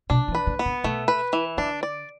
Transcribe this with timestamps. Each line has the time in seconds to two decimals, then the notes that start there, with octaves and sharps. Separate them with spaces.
0.10 B2 D4
0.28 E3
0.35 B4
0.47 D3
0.59 B3
0.65 D3
0.84 B2 A3
1.08 B4
1.33 E3
1.57 D3 D4
1.83 D5